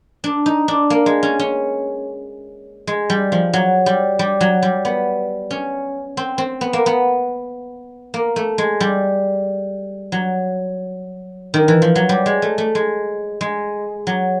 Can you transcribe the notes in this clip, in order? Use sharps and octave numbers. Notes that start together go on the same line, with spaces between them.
D4
D#4
D4
A#3
G#3
C#4
C#4
G#3
G3
F3
F#3
G3
G3
F#3
G3
B3
C#4
C4
C4
B3
A#3
B3
A#3
A3
G#3
G3
F#3
D#3
E3
F3
F#3
G3
G#3
A3
A3
G#3
G#3
F#3